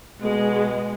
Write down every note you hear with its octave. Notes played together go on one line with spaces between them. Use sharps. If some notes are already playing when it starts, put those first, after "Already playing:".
B2 G#3